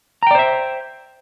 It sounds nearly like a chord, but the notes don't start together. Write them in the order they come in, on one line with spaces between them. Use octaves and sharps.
A#5 G5 D5 C5 E5